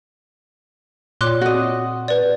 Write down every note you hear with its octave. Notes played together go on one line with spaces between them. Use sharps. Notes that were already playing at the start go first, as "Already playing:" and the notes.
A#2 F4 C#5 D5 C6 D6 F#6
C4 F#4 D#5
B4 D5